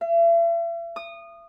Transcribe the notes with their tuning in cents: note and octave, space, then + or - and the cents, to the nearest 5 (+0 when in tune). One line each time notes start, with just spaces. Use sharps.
E5 +40
D#6 -20